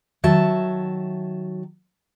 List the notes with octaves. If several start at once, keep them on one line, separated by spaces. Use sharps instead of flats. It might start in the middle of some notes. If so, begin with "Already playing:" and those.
D#3 F#3 E5 A5